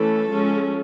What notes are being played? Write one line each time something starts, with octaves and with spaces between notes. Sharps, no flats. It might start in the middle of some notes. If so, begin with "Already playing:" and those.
Already playing: E3 A3 C#4 A4
F3 G#3 C#4